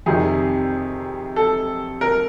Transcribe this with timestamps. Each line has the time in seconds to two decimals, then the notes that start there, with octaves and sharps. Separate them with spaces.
0.06 F2 C3 D#3 G3 G#4
1.36 A4
2.01 A#4